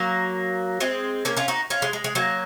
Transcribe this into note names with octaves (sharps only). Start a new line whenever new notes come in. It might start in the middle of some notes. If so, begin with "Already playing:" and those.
Already playing: F#3 A#3
G#3 C4
A#3 C#4
C#4 F4
D#4 F#4
C#4 F4
G#3
G#3
G#3
F#3 A#3